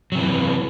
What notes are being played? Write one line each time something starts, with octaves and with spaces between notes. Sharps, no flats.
C3 E3 F#3